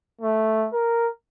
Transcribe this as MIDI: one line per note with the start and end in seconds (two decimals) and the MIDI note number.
0.22 0.68 57
0.73 1.08 70